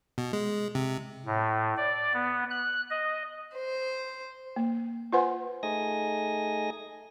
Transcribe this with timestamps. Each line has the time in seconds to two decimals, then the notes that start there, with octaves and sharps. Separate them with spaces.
0.18 B2
0.33 G#3
0.75 C3
1.26 A2
1.77 D5
2.13 B3
2.50 F#6
2.90 D#5
3.54 C5
4.56 A#3
5.13 F4 B4 C5 F#5 G#5 C6
5.63 A3 D#4 G#4 G#5 D#6 A#6